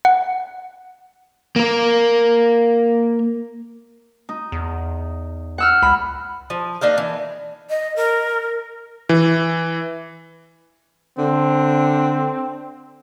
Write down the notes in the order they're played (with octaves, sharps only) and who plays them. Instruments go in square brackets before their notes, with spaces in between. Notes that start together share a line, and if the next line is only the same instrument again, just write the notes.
[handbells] F#5
[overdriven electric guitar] A#3 A#4
[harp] D#4
[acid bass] E2
[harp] F#5 E6 F6
[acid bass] C#2 [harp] B5
[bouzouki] F3
A#3 D4 D#4 F5
E3
[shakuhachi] D#5
A#4
[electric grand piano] E3
[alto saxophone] D3 [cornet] C4